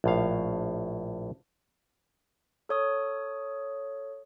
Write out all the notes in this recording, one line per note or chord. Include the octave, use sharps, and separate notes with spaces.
A#1 A2 F5
A4 C#5 D#6